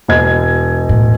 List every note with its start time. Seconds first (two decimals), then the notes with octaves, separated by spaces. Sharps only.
0.08 E1 D#5 G#6
0.89 A2